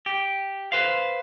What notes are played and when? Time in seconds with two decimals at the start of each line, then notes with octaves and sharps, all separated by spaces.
0.06 G4
0.72 B4 C5 F5